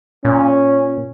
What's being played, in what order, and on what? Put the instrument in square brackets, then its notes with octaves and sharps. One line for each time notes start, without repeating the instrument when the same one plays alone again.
[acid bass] A#2 [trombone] C#4